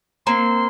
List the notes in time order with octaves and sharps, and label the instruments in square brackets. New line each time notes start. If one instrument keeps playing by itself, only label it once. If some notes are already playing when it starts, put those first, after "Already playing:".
[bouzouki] A#3 C4 [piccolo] C6